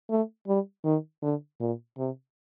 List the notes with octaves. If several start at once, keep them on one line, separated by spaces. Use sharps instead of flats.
A3
G3
D#3
D3
A#2
C3